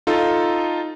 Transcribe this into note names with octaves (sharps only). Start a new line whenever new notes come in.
D#4 F4 A4